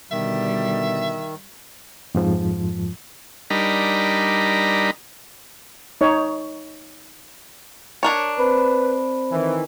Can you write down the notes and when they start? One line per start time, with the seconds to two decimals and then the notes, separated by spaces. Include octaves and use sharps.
0.11 B2 D3 D#3 G3 E5
2.15 F2 G#2 F3
3.50 G3 D4 D#4 A#4 B5
6.01 D#4 C#5
8.03 D4 A#4 C#5
8.38 C4 B4 C5 B5
9.32 D#3 E3